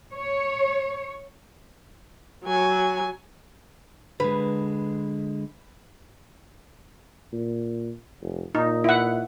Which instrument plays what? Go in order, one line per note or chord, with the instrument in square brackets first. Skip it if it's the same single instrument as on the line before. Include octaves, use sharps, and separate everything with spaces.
[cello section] C#5
[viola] F#3 G#5
[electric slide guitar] D3 G#3 [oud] B4
[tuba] A#2
F1
[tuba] A#2 [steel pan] D#4
[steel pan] E4 F#5